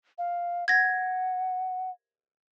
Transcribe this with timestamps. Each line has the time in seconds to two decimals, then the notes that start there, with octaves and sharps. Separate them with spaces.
0.18 F5
0.68 F#5 G#6 A#6